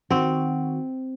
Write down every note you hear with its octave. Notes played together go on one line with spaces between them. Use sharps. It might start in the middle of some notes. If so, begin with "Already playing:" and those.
D#3 C4 F#4